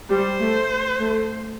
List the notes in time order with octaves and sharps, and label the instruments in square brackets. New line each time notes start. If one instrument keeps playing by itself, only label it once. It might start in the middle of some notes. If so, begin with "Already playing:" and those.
[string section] G3 [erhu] C5
[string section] A3
A3